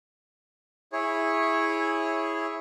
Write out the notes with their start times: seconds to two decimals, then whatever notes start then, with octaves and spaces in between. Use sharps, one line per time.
0.93 E4 G#4 C#5